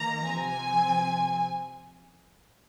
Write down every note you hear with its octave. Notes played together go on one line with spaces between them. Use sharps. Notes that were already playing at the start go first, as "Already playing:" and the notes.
Already playing: D#3 A#3 A#5
C3 F3 C4 G#5